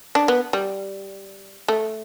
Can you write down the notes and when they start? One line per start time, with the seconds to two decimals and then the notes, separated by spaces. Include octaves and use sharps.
0.15 D4
0.28 B3
0.53 G3
1.68 A3